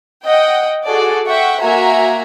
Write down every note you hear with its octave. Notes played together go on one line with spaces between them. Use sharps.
D#5 F#5 G5
F#4 G#4 A4 D5
E5 F#5 G5 C#6
A#3 F#4 E5 G#5 A#5